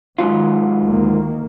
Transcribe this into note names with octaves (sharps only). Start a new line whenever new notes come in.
G#2 D#3 F#3 F4
D2 D#3 A#3